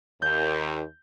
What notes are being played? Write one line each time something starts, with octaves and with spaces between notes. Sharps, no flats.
D#2 G6